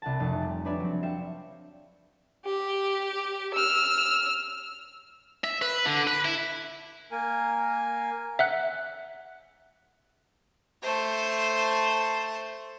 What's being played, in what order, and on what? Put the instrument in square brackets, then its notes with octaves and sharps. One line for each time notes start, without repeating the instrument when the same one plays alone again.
[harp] C2 F#5 A5
F1 C#7
G3
D4 B4 C#5 D5 E5
F#3 G3 C4
E5 F5 G5 C#7 E7
[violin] G4
E6 F6
[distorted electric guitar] E5
B4
D3
B4
E4
[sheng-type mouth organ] A#3 A#4 G#5
[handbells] E5 F#5 F#6
[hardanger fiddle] A3 C5